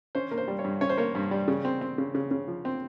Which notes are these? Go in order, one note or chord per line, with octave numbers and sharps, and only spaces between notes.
C#4 C5
A#3
C5
G3
C#5
G2
C#4 C#5
C5
A#3 C#5
G2
G3
C#3
C4
C4
C#3
C#3
C#3
F3
C4